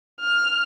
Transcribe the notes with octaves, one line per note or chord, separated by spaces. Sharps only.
F6